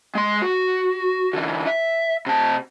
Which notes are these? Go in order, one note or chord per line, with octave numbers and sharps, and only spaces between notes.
G#3 C6
F#4
D3 E3
E5
C3 A5